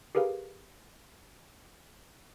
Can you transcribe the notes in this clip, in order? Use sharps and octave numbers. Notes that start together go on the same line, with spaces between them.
G4 G#4 A#4 B4 F5